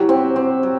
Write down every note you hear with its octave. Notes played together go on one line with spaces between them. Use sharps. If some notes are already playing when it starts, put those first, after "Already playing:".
Already playing: F#3 E4 G4
C4
C4
F#3